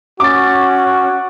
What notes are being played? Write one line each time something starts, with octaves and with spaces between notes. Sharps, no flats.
C#4 F#4 D6 A6